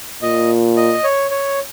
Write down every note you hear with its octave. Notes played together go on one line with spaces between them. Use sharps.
A#2 D#5
D#5
C#5
C#5